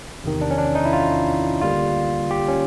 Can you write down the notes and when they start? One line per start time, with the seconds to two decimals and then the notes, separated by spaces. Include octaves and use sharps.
0.24 E2 C3 D#3
0.41 D4
0.51 C#4
0.58 D4
0.75 D#4
0.85 E4
0.93 F4
1.62 D2 D3 G3 A#3 F4
2.31 G4
2.48 C#4